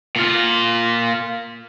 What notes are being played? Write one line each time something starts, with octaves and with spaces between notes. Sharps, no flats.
A#2 F4